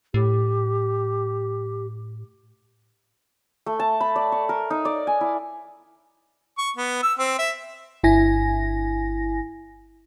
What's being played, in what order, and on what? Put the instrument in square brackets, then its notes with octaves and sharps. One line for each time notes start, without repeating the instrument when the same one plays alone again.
[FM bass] A2 [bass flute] G4
[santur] A3
A5
B5
D5
C#6
A#4
D#4
D5
G#5
E4
[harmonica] C#6
B3
E6
C4
E5
[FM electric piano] G1 E4 G#5 A#6